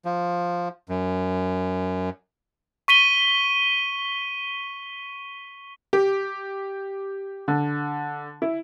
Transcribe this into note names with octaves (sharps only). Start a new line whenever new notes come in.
F3
F#2
C#6 B6 D#7 G7
G4
D3
E4